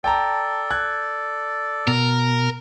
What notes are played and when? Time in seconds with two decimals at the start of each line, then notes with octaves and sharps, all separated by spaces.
0.04 A4 D5 G5 A5 A#5
0.71 F#6 G#6
1.87 B2 A#4